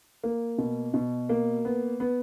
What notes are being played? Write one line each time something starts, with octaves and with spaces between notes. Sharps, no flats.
A#3
B2
B2
A#3
B3
B3